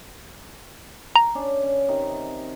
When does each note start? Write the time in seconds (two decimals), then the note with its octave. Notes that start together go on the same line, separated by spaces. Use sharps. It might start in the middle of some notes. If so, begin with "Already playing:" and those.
1.16 A#5
1.35 C#4 D4
1.63 C#4
1.88 C3 D#3